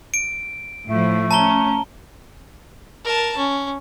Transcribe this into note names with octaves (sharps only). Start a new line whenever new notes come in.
D7
A2 F3 A3 E4
C#4 A5 A#5 G7
A#4 A5
C#4